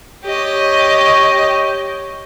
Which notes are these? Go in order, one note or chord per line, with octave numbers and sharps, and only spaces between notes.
G4 C#5 D#5